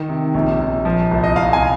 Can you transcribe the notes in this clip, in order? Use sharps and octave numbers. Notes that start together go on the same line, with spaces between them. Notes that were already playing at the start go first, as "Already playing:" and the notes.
Already playing: D#3
C3
A#1
A#1
F3
C2
D#5
C2 F5
G#5